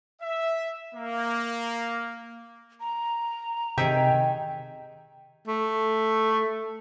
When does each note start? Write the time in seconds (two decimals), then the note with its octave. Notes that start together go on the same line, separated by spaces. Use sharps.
0.22 E5
0.95 A#3
2.81 A#5
3.78 C3 D#3 G#4 E5 G5
5.48 A3